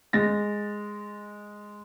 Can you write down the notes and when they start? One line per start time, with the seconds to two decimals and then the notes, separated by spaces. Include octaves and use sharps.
0.13 G#3 A6 A#6